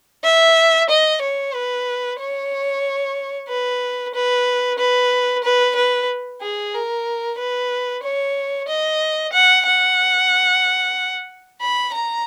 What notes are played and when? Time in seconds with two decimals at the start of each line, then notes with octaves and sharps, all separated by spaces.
0.24 E5
0.89 D#5
1.22 C#5
1.54 B4
2.19 C#5
3.49 B4
4.14 B4
4.79 B4
5.44 B4
5.76 B4
6.42 G#4
6.74 A#4
7.38 B4
8.03 C#5
8.68 D#5
9.33 F#5
9.66 F#5
11.61 B5
11.93 A#5